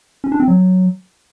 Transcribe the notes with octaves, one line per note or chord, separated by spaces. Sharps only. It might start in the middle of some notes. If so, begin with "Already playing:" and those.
C#4
D4
C4
F#3